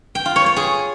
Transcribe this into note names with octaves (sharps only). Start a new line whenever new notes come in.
G5
F4
C#5
C#5
G#4